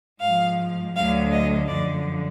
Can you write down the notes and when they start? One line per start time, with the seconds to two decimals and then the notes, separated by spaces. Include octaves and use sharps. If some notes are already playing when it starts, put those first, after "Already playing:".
0.22 G#2 F3 F5
0.95 D2 D3 F#3 F5
1.32 D#5
1.68 F#2 D3 F3 D5